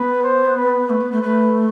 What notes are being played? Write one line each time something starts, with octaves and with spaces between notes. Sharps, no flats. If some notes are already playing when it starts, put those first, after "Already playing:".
Already playing: B3 B4
C5
B4
A3 B4
B3
A3
A3 B4